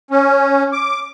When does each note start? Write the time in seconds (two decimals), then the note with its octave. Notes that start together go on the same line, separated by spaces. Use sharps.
0.11 C#4
0.73 D6